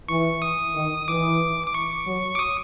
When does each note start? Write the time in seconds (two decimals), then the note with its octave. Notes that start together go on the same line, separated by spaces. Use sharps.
0.08 E3 C#6
0.42 D#6
0.75 D#3
1.08 E3 D6
1.66 D6
1.74 C#6
2.06 F#3
2.35 D6
2.39 D#6